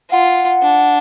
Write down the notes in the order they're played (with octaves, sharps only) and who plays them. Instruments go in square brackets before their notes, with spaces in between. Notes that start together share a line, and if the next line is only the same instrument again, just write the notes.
[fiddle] F4 [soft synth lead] F#5
[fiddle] D4